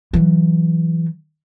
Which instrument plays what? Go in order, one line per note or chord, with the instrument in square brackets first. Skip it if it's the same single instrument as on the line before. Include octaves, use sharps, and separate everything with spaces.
[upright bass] E3 F#3